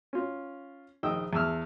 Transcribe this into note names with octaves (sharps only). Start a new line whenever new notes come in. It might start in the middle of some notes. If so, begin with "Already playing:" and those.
C#4 F4
A#1 D#3 D#5 G5 D#6 E6
E2 A5 E6 F6